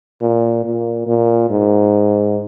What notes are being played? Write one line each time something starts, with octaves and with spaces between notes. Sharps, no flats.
A#2
A#2
A#2
G#2